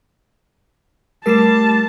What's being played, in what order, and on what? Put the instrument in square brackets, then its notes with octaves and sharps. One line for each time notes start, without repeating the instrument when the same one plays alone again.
[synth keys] G3 G4 C7 [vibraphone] A3 [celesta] A#4 E7 [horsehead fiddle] A5